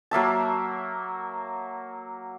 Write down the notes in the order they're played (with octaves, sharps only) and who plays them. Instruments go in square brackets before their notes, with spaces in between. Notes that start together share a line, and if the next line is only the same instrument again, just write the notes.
[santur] F#3 A#3 E5 A5